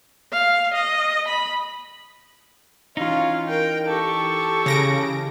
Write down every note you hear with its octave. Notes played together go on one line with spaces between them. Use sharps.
F5
D#5
B5
E3 C#4 D#4 F4
A#4 G5
G4 A4 C#6
C#3 A#6 D7